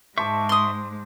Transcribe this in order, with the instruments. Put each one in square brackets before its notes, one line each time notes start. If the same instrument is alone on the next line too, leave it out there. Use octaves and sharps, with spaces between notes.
[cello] G#2 G#3 [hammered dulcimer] C5 A5 D6 [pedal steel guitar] E5 C#6
[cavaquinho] C6 D#6